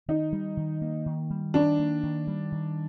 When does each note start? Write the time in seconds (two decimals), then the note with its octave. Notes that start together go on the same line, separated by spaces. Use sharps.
0.08 D#3 D#4
0.33 G3
0.57 D#3
0.82 A#3
1.06 D#3
1.30 G3
1.54 D#3 D4
1.79 A#3
2.03 D#3
2.27 G3
2.52 D#3